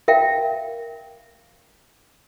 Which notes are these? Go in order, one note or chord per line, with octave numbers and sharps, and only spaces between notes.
A#4 E5 F5 G5